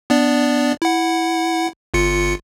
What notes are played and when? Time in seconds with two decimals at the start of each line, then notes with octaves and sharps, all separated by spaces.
0.10 B3 D4 D5
0.82 E4 F#5
1.94 G1 F4 C#7